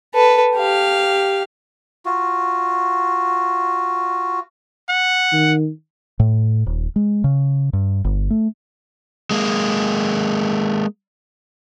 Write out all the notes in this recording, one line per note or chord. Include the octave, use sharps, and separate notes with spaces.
A4 B4
G4 F5
F4 F#4
F#5
D#3
A2
D#1
G#3
C#3
G2
G1
A3
G#3 A#3